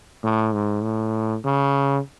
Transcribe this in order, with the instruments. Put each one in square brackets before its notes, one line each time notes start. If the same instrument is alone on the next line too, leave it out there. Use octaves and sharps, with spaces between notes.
[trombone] A2
G#2
A2
C#3